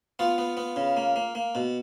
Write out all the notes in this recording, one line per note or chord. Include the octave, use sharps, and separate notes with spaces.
B3 F4
B3
B3
C#3
A#3
A#3
A#3
B2